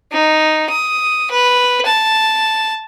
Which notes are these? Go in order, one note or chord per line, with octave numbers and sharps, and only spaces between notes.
D#4
D#6
B4
A5